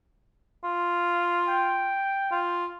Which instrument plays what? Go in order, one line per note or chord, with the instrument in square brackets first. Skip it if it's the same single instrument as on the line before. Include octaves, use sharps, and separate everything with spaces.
[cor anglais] F4
[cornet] G5
[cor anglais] F4